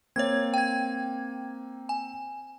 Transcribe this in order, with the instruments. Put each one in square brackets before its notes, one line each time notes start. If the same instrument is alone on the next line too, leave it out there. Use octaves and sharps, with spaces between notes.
[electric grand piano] A#3 C4 [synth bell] C#5 G#6
[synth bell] G5 G#6
G#5